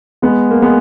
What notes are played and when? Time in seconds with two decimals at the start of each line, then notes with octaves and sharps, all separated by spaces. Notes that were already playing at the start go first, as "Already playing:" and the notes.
0.22 G#3 B3
0.51 A#3
0.62 G#3 B3